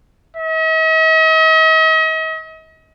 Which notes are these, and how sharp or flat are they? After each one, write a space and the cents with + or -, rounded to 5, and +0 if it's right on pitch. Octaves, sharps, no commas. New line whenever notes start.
D#5 +45